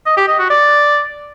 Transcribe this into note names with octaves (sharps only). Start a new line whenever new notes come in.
D#5
G4
D#5
F#4
D5